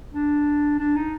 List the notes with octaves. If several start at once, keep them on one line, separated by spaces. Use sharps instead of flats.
D4
D4
D#4